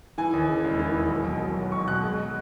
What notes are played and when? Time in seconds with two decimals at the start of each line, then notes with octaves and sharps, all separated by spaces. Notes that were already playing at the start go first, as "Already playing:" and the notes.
0.18 E3 G#5
0.33 D#2
0.49 C#3
0.64 E1
0.79 E3
0.95 D#2
1.10 B1
1.26 B2
1.41 F#3
1.57 B1
1.72 B1 C#6
1.88 B2 F#6
2.04 G#3